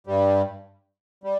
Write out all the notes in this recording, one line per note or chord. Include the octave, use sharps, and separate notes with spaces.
G2 G3
G3